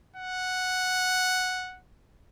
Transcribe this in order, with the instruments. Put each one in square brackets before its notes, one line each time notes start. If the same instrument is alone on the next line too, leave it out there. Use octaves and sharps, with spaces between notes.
[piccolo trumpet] F#5